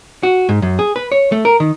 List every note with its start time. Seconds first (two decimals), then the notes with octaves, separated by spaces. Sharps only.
0.23 F#4
0.49 G#2
0.62 F#2
0.79 G#4
0.96 B4
1.12 C#5
1.32 A3
1.45 A#4
1.60 D#3